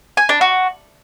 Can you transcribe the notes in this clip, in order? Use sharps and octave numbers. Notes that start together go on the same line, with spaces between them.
G#5
D4
F#4